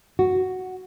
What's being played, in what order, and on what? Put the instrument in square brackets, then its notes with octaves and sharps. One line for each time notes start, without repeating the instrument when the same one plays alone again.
[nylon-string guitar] F#4